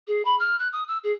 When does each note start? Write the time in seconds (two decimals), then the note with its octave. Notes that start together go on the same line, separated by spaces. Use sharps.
0.07 G#4
0.25 B5
0.39 F6
0.59 F#6
0.73 D#6
0.88 E6
1.04 G#4